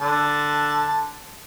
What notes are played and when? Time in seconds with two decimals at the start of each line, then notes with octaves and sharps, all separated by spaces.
0.01 D3 A5